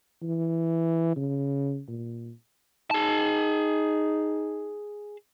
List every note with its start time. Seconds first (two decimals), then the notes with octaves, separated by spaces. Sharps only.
0.23 E3
1.16 C#3
1.88 A#2
2.91 D#4 G#4 A5